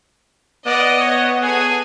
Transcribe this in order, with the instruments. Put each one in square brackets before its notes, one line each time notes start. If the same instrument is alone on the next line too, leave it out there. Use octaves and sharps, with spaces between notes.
[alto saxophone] B3 [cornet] D5 [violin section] D#5
[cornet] C#5
[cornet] G#4 [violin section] A4 G#5